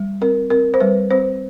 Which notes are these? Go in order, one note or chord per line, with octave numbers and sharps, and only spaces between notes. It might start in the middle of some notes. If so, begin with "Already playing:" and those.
Already playing: G3
C4 A#4
C4 A#4
C5
G3 B4
C4 C5